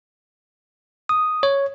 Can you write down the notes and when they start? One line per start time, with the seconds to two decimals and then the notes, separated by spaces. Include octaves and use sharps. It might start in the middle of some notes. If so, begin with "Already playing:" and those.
1.09 D#6
1.43 C#5